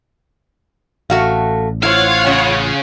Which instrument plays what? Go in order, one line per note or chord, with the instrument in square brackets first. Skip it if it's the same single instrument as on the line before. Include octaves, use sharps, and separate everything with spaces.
[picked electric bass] A1 [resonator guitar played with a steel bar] A3 F#4 F5
[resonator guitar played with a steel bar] E4 C5 [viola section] F4 C#5 F#5 [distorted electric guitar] F5
[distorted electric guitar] C#3 [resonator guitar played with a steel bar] C#4